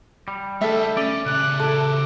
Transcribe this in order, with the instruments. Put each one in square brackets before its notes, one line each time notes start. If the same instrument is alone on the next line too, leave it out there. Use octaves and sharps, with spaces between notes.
[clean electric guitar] G3
[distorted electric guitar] A3 F#5 [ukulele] A4 E5
[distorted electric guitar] C#4 [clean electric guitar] D5
[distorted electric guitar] C#3 G4 [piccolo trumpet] F#6
[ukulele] E4 A4 [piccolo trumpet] D6